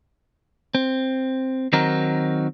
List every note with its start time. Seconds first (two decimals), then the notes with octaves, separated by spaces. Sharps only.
0.75 C4
1.73 D#3 F#3 C4 D#4 F#4 A#4